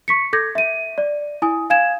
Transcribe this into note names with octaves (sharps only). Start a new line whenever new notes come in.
C#6 B6 C#7
A4 D6 G6 G#6 A#6
E5 D#7
D5
E4 G#5 D#6
F5 G#5 G#6 E7